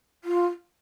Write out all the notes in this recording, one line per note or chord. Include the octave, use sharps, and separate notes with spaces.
F4